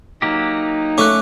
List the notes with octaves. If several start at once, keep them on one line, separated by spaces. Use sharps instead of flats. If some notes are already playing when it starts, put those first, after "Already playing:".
F#3 A#3 D#4 G4
A3 C#4 D6 F#6